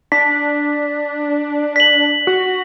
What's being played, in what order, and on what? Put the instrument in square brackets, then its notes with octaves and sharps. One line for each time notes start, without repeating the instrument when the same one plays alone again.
[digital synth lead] D4 [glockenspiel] B6
[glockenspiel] B6 F#7
[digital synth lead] F#4